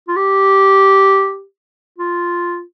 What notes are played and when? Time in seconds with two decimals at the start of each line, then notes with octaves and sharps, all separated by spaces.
0.08 F4
0.16 G4
1.98 F4